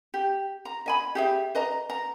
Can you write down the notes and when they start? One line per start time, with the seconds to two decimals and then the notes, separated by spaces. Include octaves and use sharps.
0.14 G4
0.65 A#5
0.86 D#5 G#5 B5
1.15 G4 G#4 E5
1.55 B4 D#5 A#5
1.90 A#5